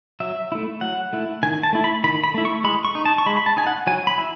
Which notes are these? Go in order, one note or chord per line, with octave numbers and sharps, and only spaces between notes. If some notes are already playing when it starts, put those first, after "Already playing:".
F#3 E5
A3 E4
F#3 F#5
A3 E4
D#3 G#5
A5
A3 E4
B5
D#3 B5
B5
A3 E4
C#6
G#3 B5
C#6
D#4
A5
C#6
G#3 B5
B5
A5
D#4 G#5
F#5
F#3 G#5
B5
E4